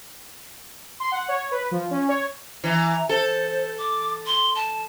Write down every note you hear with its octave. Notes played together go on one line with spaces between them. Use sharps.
C6
F#5
C#5
B4
F3
C#4
C#5
E3 A#5
A4 C5
D6
C6
A5